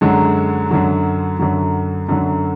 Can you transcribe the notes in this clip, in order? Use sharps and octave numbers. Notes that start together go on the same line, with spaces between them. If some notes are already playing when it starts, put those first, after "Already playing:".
F#2 D3 F#3 G#3
F#2 D3 F#3
F#2 D3 F#3
F#2 D3 F#3